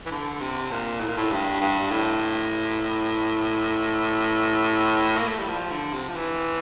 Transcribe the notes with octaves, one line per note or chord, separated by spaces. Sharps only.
E3
D3
C3
A#2
A2
A#2
A2
G2
G2
A2
A#3
A3
G3
F3
D3
C3
F3
E3